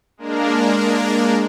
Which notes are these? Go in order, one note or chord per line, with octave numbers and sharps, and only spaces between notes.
G#3 A#3 D4 A#4